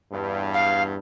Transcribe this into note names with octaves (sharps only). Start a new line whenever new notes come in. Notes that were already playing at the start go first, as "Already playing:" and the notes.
E2 G2
F5